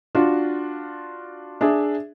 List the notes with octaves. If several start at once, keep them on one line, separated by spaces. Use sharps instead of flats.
D4 F4 F#4
D4 G#4 E5